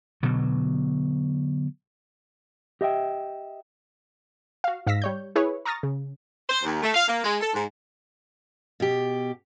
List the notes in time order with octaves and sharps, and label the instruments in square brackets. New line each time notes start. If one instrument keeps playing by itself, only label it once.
[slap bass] B2 D3 F#3
[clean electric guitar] G4 D#5 E5 G5
[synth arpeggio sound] F#4 F5
G#2 F5 E6 A#6 B6
G3 C#5 G6
E4 G#4 B4 C#5
A#5 C#6 D#6 F6 A6 A#6
C#3
[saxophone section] C5
D#2
A3
F5
A#3
G#3
A4
G#2
[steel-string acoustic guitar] B2 G4